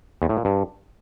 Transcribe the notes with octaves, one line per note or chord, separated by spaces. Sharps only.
E2
A2
A#2
G2